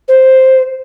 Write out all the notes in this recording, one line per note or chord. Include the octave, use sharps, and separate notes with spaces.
C5